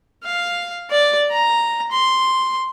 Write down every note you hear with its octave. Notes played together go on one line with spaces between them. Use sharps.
F5
D5
A#5
C6